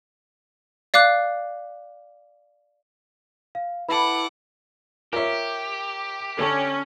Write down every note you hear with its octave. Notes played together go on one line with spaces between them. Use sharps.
D5 F5 D6 F#6
F5
E4 A4 B4 F#5 A5 D6
F4 G4 A#4 C#5 E5
D3 C#4 A4 A5